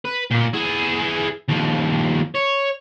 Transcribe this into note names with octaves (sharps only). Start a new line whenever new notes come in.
B4
A#2 A#3
E4 G#4
D#2 F3
C#5